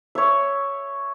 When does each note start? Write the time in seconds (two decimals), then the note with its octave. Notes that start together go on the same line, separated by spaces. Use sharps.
0.15 C#5 E5